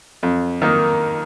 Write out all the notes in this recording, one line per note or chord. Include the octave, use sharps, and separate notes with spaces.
F2
D#3 A#3 D#4